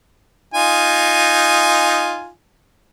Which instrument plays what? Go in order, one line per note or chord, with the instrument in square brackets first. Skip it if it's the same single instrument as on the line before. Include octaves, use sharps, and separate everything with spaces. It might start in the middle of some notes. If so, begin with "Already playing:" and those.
[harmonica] D#4 F4 G#5